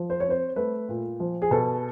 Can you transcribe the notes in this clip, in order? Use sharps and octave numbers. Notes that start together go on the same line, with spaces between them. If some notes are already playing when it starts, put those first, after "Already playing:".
Already playing: F3
C5
C#5
C4 C5
A3 B4
A#2
F3
G#4
B2 A4